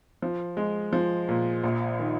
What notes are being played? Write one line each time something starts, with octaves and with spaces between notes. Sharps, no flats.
F3
G#3
F3
A#2
A#1
D#3